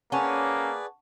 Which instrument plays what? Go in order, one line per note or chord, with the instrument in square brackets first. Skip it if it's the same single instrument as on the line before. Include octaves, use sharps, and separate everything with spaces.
[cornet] A#3 [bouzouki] C#4 [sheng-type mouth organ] G#4 B4 D5 [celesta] F#5 A5 C#6